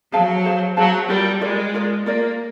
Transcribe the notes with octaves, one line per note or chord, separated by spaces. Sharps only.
F#3 G#4 C5 F5 A5
G#4 C5 F5 A5
F#3 G#4 C5 F5 A5
G3 F4 A#4 D5
G#3 F4 A#4 D5
F4 A#4 D5
A#3 F4 A#4 D5